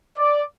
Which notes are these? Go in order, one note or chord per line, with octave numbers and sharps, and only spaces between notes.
D5